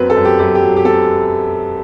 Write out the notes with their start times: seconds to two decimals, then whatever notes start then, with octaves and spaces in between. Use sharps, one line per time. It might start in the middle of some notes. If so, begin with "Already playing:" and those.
Already playing: F#2 F#3 C4 B4
0.10 A4
0.17 F#2
0.25 G4
0.39 F#2 G4
0.55 G4
0.62 F#3
0.76 G4
0.85 C4 A4